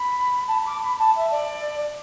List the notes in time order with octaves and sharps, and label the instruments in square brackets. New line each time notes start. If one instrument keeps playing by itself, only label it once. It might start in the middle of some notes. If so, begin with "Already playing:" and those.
Already playing: [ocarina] B5
A5
B5
D6
B5
A5
E5
D5